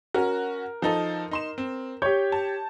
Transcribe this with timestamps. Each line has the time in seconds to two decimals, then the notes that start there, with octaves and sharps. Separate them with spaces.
0.14 C#4 F#4 A#4
0.82 F3 D#4 A4
1.31 D#4 C6 E7
1.58 C4
2.02 G4 C#5 G6
2.32 A5